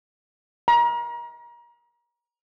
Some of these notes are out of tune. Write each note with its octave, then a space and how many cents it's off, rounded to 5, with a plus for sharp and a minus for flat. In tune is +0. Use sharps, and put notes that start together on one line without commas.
A#5 +30